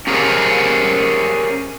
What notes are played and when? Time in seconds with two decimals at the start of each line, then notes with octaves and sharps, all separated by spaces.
0.07 C#4 G4 G#4 A#4 C5 C#5